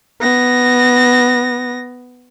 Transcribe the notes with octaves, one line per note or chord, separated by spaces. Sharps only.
B3 A#6